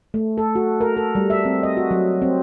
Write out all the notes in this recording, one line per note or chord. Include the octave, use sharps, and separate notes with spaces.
A3
A4
F#4
A#4
A4
G3
E5
C4
D#5
F#4
F#3
C4